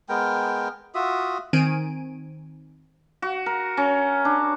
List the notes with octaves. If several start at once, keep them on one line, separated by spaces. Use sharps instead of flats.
G#3 B3 A#4 G5
F4 F#4 E5 D#6
D#3 C4 G#5 D7 D#7
F#4
A#4
C#4
D4